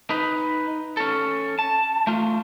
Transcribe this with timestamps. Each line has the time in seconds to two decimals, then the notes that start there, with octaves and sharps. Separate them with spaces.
0.10 D#4 B4
0.97 C#4 A4
1.59 A5
2.07 A3 F4